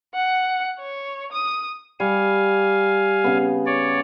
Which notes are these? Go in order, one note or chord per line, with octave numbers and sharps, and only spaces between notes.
F#5
C#5
D#6
G3 F5 G#5 C#6
C#3 B3
C#5 D5